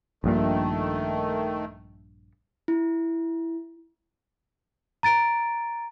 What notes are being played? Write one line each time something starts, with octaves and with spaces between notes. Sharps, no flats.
A#1 G2 A#2 D#3 A3
E4
A#5 A6 D7